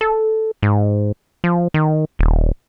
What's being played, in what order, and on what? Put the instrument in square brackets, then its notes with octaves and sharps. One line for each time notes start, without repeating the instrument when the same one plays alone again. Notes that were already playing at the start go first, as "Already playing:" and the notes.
[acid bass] A4
G#2
F3
D#3
D#1